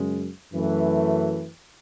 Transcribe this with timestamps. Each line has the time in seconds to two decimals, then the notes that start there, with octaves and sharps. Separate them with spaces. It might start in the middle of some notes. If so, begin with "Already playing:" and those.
Already playing: F#2 C#3 G#3
0.54 F#2 E3 A3